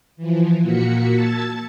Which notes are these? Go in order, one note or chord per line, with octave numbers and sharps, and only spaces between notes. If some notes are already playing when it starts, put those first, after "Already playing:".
E3 F3
A#2 A#3 F#4 B6 C#7
A5 E6 G#6 A6